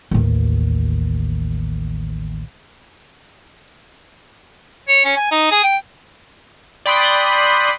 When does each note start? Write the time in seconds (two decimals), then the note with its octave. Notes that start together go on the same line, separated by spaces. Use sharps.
0.11 A1 D#2
4.89 C#5
5.05 C#4
5.17 G#5
5.32 D#4
5.51 G#4
5.64 G5
6.86 D5 G5 B5 C6 D#6 F#6